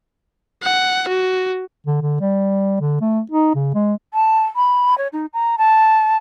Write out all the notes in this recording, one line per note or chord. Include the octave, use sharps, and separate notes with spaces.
F#5
F#4
D3
D3
G3
D3
A3
D#4
C#3
G#3
A5
B5
C#5
D#4
A#5
A5